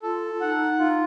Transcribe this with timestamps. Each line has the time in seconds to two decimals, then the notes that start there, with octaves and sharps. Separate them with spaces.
0.02 F4 A4
0.41 D#4 F#5
0.78 D#4 F4